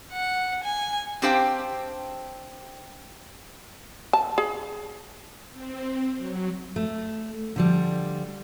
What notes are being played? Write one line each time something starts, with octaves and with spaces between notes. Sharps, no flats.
F#5
G#5
C4 D4 G4 C5 F5 G5
A5
G#4
C4
F#3
A3
D3 F3 G3